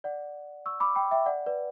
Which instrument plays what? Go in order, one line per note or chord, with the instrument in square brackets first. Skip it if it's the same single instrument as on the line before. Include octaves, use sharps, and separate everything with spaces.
[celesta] D5 F#5
C#6 E6
B5 D6
G5 B5
E5 G5
D5 F#5
B4 D5